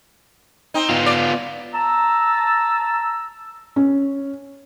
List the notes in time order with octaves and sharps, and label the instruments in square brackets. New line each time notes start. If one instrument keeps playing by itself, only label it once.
[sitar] C4 D#4
[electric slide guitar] B3 F4
[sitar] D5
[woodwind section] A5 A#5 E6
[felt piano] C#4